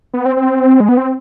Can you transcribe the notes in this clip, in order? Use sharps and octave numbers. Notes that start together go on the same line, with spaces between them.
B3
C4
C4
G#3
B3
C4